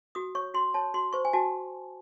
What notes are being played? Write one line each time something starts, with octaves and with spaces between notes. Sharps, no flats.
F#4 D#6
C#5 C#6
F#4 C6
C#5 A5
F#4 C6
C5 C#6
G#5
F#4 A5